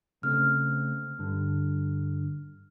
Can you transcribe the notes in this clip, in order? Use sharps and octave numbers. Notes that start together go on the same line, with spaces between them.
C#3 A3 C4 F6
G2 D3